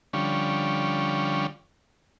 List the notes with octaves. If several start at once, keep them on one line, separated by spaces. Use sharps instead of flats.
D3 F3 G3 C#4